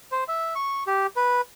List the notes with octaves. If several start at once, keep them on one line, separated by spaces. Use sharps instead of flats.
C5
E5
C#6
G4
B4